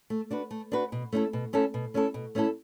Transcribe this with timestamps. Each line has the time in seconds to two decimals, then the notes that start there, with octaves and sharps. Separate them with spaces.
0.10 A3
0.31 D4 F#4 B4
0.51 A3
0.72 D4 F#4 B4
0.92 B2
1.13 A3 C#4 E4 A4
1.33 B2
1.53 A3 C#4 E4 A4
1.74 B2
1.94 A3 C#4 E4 A4
2.14 B2
2.35 A3 C#4 E4 A4